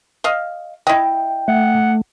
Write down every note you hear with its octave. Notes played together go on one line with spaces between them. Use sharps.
D#5 F5
E4 D#5 G5
A3 F#5